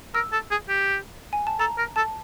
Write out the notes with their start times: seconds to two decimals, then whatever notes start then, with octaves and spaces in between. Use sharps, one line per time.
0.14 A#4 E6
0.32 A4
0.51 G#4
0.69 G4
1.33 G#5
1.47 A5
1.59 A4 A#5
1.78 A#4
1.96 A4 A5